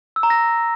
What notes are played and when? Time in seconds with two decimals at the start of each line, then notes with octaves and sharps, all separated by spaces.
0.16 E6
0.23 A#5
0.30 A#6